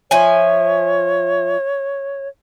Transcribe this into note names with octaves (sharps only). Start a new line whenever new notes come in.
F3 C#5 E5 G#5